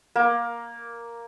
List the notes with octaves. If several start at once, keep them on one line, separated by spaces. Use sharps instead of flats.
A#3